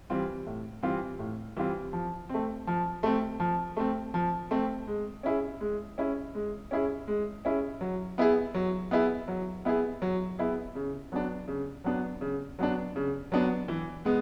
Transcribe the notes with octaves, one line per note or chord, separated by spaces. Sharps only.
E3 G3 C4 F4
A2
E3 G3 C4 F4
A2
E3 G3 C4 F4
F3
A3 C4
F3
A3 C4
F3
A3 C4
F3
A3 C4
G#3
C#4 E4 G#4
G#3
C#4 E4 G#4
G#3
C#4 E4 G#4
G#3
C#4 E4 G#4
F#3
B3 E4 G#4
F#3
B3 E4 G#4
F#3
B3 E4 G#4
F#3
B3 E4 G#4
C#3
F#3 B3 D4
C#3
F#3 B3 D4
C#3
F#3 B3 D4
C#3
F#3 B3 D4
E3
G#3 B3